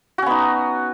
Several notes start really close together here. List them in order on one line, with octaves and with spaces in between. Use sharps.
F#4 C#4 B3 D#4